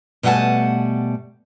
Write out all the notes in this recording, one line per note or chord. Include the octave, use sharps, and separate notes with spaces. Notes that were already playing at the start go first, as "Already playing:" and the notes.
B2 G3 A3 F#5 G#5 A5